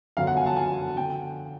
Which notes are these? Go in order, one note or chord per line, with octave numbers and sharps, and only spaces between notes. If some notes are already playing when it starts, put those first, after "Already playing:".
G1 F#2 D3 F#3 F5
F#5
G#5
A5
G#5
D3 G5